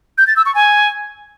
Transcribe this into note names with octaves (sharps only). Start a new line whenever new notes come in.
G6
A6
E6
C#6
G#5